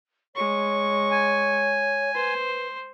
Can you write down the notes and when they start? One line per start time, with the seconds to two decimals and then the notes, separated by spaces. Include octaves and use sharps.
0.35 G#3 C#5 C#6
1.12 G#5
2.14 B4 C5